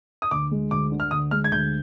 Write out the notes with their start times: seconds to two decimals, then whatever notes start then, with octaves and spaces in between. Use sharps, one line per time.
0.22 D#6
0.31 D2 D6
0.51 G#3
0.71 D2 D6
0.92 D3
1.00 F6
1.11 D2 D#6
1.31 G#3 F6
1.44 G#6
1.51 D2 G6